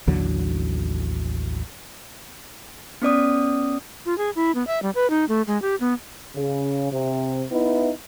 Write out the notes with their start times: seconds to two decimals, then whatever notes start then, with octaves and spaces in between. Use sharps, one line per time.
0.07 A1 D#2 D3 F#3
3.02 B3 C#4 D5 D#6
4.06 F4
4.18 G#4
4.36 E4
4.55 B3
4.67 E5
4.83 G3
4.95 B4
5.10 D#4
5.29 A3
5.47 G#3
5.62 G4
5.80 B3
6.35 C#3
6.91 C3
7.50 B3 D#4 E4